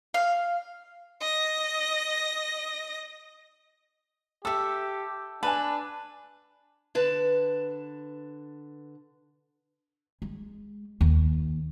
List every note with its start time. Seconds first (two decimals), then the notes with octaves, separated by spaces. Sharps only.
0.14 F5
1.21 D#5 A#6
4.45 G4 A4 E5 E6
5.43 D4 B4 G#5 A5
6.95 D3 B4 A5
10.22 G#3
11.01 D#2